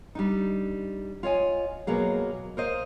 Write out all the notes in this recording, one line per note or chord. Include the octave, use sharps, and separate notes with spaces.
G3 D4 D#4
F4 C#5 D#5 G#5
B2 F#3 A#3 G#4
A#4 C5 D#5 F5